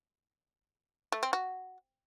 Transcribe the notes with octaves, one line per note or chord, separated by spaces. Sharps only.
A3
C4
F#4